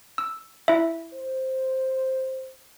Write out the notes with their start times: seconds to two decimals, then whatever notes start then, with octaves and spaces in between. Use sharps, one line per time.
0.18 E6
0.68 E4 E5
1.13 C5